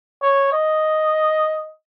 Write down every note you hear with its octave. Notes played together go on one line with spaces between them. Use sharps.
C#5
D#5